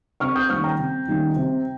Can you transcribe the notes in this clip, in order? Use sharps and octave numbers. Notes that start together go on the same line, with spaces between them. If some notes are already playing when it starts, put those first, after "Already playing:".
C3 C#6 F6
D#6 G6
D#3 G3 A#3 C#4 C#6 F6
G5 A#5
C3
D#3 G3 A#3 C#4
C3